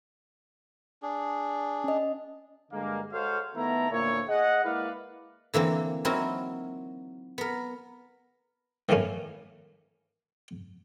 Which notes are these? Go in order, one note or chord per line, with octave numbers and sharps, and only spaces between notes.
D4 G#4
C#4 D#5
G2 D3 G#3 A#3
G#3 F#4 A4 C5 C#5 F5
D#3 A3 B3 E4 A4 A#5
D2 A#2 A#3 E4 C#5
G#4 D#5 F#5
G#3 A#3 E4 B4 D5 F5
D3 E3 A#3 C4
F#3 C4 D#4 E4 F#4 A#4
B3 A#4
D#3 E3 A3 A#3 C#4